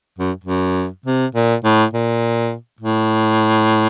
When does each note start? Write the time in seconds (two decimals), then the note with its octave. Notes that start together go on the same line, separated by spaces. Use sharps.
0.19 F#2
0.44 F#2
1.06 C3
1.35 A#2
1.64 A2
1.93 A#2
2.80 A2